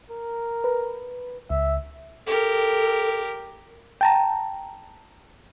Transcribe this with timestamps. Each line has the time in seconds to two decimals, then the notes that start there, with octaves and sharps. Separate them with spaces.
0.10 A#4
0.64 B4
1.50 C#2 E5
2.27 G4 A4 A#4
4.01 G5 A5 A#5